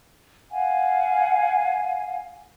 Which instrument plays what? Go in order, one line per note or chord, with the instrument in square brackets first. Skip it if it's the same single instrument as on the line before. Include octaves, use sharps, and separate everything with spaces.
[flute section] F5 F#5 G#5